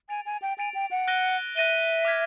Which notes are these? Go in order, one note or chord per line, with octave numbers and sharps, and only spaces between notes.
G#5 A6 D7 F7
G#5
G5
G#5 A6 D7 F7
G5
F#5
F#6 A#6 D#7 G7
E5 F#6 A#6 D#7 G7
D6 F6 G#6 B6